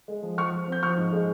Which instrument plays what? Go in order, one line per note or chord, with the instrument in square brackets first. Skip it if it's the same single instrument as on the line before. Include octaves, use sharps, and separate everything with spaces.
[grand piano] G#3
F3
F3 C#6 F6
F3
C4 G6
F3 C#6 F6
G#2
G#3